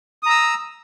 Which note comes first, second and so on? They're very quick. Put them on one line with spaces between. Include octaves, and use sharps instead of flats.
D#6 A#5 E6